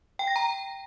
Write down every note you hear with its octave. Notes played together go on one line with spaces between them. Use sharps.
G5
A#6
A#5